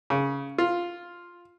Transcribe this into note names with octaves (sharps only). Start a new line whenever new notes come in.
C#3
F4